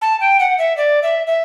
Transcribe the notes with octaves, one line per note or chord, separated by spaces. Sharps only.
A5
G5
F#5
E5
D5
E5
E5